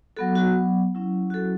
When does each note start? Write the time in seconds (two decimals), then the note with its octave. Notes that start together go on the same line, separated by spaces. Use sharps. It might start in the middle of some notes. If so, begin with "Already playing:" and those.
0.17 F#3 B3 F#4 A4
0.36 F#4
0.95 F#3 C#4 E4
1.30 F#4
1.34 A4